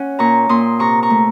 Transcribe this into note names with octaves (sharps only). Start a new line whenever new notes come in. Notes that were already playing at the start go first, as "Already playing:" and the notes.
Already playing: C#4 F#5
A#2 A#5 C#6
A#2 C6 D#6
C3 A#5 C#6
A#5 C#6
A3